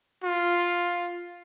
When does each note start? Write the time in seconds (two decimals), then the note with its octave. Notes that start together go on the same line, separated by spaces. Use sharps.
0.24 F4